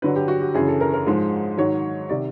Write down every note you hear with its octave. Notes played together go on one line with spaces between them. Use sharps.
G2 D3 F#3 B4
G4
F#4
G4
F#2 C#3 E3 G#4
A4
A#4
A#4
G#2 F3 G#3
G#2 D#3 F#3 C#5
C3 D#3 D5